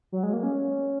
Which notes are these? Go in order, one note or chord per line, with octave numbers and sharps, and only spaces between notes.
F#3
G#3
A#3
C#4